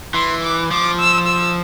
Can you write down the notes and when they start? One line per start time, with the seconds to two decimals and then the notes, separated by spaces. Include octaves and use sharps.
0.14 E3 C6
0.43 D6
0.71 F3 D6
0.99 E6
1.27 E6